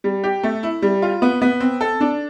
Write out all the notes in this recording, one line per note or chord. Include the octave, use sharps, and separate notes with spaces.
G3
G4
A3
E4
G3
F4
B3
B3
C4
A4
D4